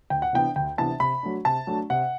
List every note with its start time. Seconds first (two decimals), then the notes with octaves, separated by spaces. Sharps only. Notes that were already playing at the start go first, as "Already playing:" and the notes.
0.10 D2 G5
0.22 F#5
0.33 C3 E3 B3 D4 G5
0.56 D2 G5
0.77 C3 E3 B3 D4 A5
1.00 C3 B5
1.23 F#3 A3 D4
1.45 C3 A5
1.67 F#3 A3 D4
1.90 C3 F#5